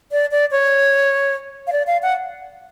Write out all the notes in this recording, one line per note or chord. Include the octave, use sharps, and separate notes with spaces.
D5
D5
C#5
F5
D5
F5
F#5